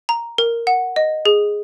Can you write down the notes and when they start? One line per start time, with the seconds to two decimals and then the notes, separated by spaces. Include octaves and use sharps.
0.09 A#5
0.38 A#4
0.67 F#5
0.96 D#5
1.26 G#4